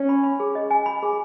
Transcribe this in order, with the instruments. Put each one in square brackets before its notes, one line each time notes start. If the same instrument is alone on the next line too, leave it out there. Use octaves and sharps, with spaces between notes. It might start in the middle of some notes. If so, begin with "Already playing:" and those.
Already playing: [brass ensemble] C#4
[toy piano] B5
B5
G#4
D#5
G#5
B5
G#4